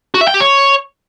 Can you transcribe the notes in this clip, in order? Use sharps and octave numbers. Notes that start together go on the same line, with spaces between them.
F#4
E5
G5
G4
C#5